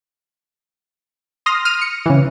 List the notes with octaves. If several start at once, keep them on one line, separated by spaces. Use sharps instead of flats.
C6 D#6 F6 A#6
F6 D#7
C#7
C#3 E3